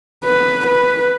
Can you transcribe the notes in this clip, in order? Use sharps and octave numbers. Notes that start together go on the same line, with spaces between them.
B4
B4